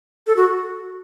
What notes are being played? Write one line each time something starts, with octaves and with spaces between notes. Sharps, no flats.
A4
F#4